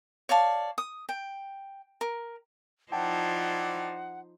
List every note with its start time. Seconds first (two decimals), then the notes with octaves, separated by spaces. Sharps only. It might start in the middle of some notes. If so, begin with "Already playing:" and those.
0.29 C#5 D5 F5 A5
0.78 D#6
1.09 G5
2.01 A#4
2.92 F3 D#4 E4 C5 D5 F#5 G5 A5